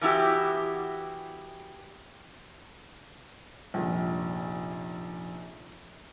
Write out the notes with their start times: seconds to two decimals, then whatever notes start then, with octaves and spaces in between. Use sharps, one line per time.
0.01 E3 B3 E4 F#4 G4
3.74 F1 A#1